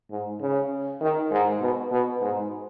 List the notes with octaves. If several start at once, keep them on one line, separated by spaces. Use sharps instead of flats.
G#2
C#3
D#3
G#2
B2
B2
G#2